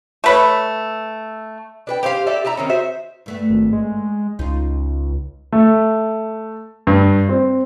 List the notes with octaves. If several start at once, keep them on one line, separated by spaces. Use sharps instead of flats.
A3 B4 C#5
D4 B4 G5
G4 C5 D#5 F5
G4 A4 D5 E5
D4 E4 E5 A#5
D#3 C4 C#4
F#4 C5 E5
G2 A3 B3
G#1
G#3
C#2 D#4 F4
A3
G2
C4